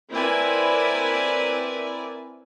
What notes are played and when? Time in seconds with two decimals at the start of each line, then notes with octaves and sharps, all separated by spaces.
0.11 C4 E4 A#4 B4 D5 G#5